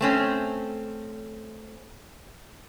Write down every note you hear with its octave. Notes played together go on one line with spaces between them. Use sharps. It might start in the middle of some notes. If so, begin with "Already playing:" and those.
A3 C4 C#4